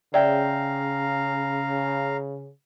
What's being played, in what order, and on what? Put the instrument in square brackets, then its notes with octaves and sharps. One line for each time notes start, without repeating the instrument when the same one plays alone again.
[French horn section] C#3 [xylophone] D5 [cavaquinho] E5 G5 [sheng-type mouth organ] F5 A#5